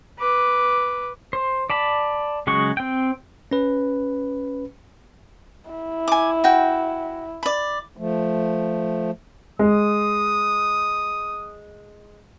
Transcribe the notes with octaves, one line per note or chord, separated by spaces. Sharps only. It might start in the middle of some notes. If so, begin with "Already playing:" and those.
B4 D6
C5
D5 A5 B5
C#3 F#3 G#3 F#4 C#6
C4 G5
C#4 B4
E4
G#5 D6
F#4 G5
D5 B5
F3 A3
G#3 D#6